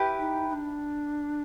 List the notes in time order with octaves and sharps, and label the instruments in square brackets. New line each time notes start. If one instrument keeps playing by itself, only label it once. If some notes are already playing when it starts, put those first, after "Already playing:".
Already playing: [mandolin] E4 G4 B4
[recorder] D#4
D#4
D4